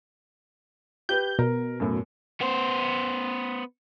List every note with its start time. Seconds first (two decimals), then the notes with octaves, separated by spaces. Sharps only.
1.09 G4 B4 G6
1.39 B2 A#4
1.80 F#2 A2
2.41 B3 C5